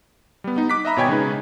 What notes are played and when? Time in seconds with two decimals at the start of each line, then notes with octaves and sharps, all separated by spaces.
0.44 G3 B3
0.56 B3 D#4
0.70 D6 F#6 B6
0.85 D#5 E5 A#5 B5
0.96 G#1 B2 C#5 G5 G#5 G#6
1.09 C#3 G#3 D#4 B4